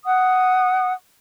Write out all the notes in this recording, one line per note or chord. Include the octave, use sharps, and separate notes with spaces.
F#5 D#6